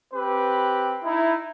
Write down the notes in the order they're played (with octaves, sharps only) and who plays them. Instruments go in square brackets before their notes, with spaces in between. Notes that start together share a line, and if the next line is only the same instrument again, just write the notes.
[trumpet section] C4 G4 B4
D#4 E4